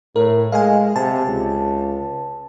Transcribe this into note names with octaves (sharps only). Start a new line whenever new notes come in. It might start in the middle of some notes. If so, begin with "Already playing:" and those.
A2 A#4
G#3 F5 G#5
C3 A5
C#2